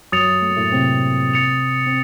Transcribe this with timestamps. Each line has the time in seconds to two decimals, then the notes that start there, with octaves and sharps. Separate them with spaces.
0.12 F#2 F#3 D#6 A6 C#7 F7
0.42 A3
0.50 A#3
0.57 A2 A3
0.72 C3 C4
1.34 A6 C#7 F7
1.87 C4